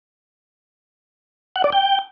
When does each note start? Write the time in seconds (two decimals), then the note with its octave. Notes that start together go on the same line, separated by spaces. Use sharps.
1.56 F#5
1.64 D5
1.72 G5